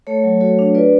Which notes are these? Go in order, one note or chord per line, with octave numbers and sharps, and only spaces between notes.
A3 A4 C#5
F#3
F#4 A4 C#5
D4
F4 B4 D5